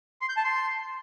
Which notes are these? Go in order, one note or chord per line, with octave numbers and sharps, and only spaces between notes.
C6
G6
A5
C6